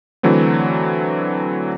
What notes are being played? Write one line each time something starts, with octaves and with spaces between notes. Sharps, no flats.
D3 E3 F#3 A3 C4